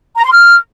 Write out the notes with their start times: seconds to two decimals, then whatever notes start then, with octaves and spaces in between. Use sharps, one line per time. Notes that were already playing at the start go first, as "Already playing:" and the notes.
0.17 A#5
0.24 C6
0.31 F6